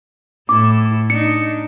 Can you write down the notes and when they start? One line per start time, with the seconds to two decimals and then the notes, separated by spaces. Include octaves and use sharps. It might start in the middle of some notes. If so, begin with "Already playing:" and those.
0.49 A2 E4 A4 D6
1.10 D4 D#4 C#7